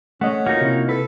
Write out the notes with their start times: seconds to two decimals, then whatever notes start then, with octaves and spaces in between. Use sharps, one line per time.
0.21 A3 C#4 D#5 F#5
0.46 A#3 D#4 F4 F#4
0.61 C3 E4
0.89 A4 B4